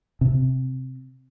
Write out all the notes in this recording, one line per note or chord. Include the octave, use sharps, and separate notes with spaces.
C3